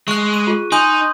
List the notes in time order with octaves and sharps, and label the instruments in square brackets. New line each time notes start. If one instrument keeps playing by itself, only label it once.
[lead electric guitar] G#3 [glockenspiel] C#6 F#6
[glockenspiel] D#7
[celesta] F4 G#4
[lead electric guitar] D#4 [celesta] G#5 [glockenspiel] C6 D#6 G6